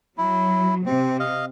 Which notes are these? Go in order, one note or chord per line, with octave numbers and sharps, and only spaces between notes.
F#3 E4
C3 C4
D#5 F5